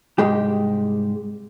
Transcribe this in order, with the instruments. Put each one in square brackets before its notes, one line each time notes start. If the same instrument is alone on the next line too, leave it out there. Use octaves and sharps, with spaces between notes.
[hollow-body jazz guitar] C2 G#2 G#3 G4